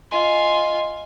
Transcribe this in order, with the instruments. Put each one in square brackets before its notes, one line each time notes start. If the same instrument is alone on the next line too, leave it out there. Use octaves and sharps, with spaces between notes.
[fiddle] F4 G#5 [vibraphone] D#5 C6